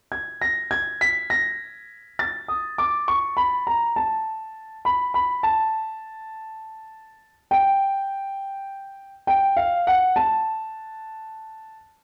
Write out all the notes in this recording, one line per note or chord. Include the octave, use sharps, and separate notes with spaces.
G#6
A#6
G#6
B6
A#6
A6
D#6
D6
C#6
B5
A#5
A5
B5
B5
A5
G5
G5
F5
F#5
A5